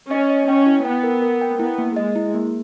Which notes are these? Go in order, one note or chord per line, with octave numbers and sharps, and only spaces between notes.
C#4 D#5
D#5
C#4 G5
E4
B3 G5
A#4
A#4
G5
B3 E4
A#3
G#3 D#5
E4
A#3